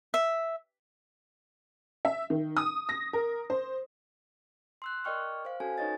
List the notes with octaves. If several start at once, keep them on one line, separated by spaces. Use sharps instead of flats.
E5
E5
D#3
D#6
A#6
A#4
C5
C6 E6 F#6
A#4 D5 D#5 G5 C#6 F6
C5 F5
C#4 F#4 A4 G#5
D#4 B4 C#5 D#5 A6